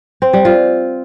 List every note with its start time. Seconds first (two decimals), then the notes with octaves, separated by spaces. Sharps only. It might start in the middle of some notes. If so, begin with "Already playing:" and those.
0.22 C4
0.33 G3
0.45 F4